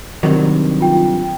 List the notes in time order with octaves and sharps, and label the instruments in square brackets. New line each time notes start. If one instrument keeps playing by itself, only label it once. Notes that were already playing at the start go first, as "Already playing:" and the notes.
[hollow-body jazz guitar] G2 C3 F#3 [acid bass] D#3
[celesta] F4 G5